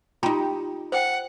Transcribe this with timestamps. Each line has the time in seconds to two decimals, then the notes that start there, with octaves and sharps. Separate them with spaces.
0.23 D#4 F4 G4 A#5 C6
0.92 C5 F#5 G5